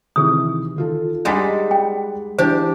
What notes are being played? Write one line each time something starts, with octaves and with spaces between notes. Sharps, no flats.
C3 D#3 E3 G#4 D#6
D#3 F4 A4
G3 G#3 D#4 F#5 A6 B6
G5
E3 D4 G4 C5